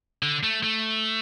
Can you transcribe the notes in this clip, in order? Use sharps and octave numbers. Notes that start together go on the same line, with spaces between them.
D3
A3
A3